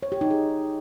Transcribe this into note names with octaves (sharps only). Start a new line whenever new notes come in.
C#5
G4
D#4
G#4